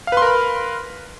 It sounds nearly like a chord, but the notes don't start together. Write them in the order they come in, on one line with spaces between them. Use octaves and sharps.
F5 B4 C6 A#4 B5